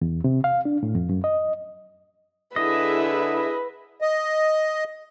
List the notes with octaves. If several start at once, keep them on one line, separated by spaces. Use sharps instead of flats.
E2
C3
F5
D4
A2
F2
F#2
D#5
D3 E4 G#4 B4 D#5 E5
D#5